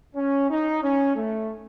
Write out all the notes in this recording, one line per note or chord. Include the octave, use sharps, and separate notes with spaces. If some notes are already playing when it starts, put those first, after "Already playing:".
C#4
D#4
C#4
A3